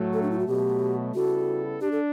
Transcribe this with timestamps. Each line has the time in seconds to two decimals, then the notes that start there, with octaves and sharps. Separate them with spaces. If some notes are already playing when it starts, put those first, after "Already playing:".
Already playing: A2 F#3 A3
0.13 A4
0.22 D4
0.31 E4
0.39 F#4
0.47 B2 F#3 A3 G4
1.14 C#3 G3 B3 E4 F#4 A4
1.81 D4 G4
1.92 A4